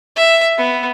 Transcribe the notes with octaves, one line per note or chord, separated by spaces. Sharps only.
E5
B3